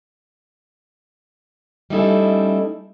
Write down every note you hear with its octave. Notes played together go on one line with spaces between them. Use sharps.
G3 A3 C#4 D#4 E4 A4